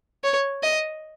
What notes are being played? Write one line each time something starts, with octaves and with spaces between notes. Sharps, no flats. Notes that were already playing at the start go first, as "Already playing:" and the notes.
C#5
D#5